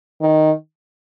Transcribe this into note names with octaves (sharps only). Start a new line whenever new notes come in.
D#3